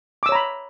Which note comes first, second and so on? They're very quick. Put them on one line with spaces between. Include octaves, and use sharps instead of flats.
D6 E6 C#5 A#5 B5